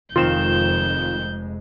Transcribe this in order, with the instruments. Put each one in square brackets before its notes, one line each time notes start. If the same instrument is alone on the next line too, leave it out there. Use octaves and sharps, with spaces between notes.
[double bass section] F1 F2 G#3 [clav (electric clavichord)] D#3 C4 [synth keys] F4 E7 [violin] G6